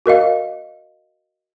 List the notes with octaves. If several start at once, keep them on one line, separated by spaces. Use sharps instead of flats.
F#4 A#4 D#5 F5